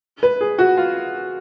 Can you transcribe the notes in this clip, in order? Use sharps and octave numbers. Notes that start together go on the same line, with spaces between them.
B4
G#4
F#4
F4